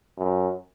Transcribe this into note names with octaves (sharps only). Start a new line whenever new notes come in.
F#2